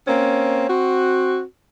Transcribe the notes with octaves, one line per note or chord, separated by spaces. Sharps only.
A#3 C4 C#4
C4 F#4